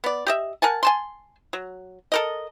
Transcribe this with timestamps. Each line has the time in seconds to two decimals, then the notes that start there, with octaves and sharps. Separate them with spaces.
0.04 B3 D5
0.27 G4 D#5 E5
0.62 A#4 F#5 G#5 A5
0.83 G#5 A5 C6
1.53 F#3
2.12 A4 A#4 D#5